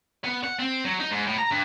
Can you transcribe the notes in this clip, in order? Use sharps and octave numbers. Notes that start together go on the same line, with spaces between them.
B3
F#5
C4
F#3
D#4
G#2
A2
A#5
G2